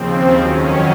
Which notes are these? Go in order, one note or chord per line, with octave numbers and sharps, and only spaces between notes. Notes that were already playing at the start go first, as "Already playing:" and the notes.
Already playing: D#2 C#3 F3 C4
F2 D#3 F#3 C#4